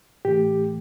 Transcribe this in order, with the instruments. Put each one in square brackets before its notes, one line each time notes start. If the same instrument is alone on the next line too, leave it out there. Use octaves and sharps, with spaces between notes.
[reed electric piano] A2 E3 A3 G4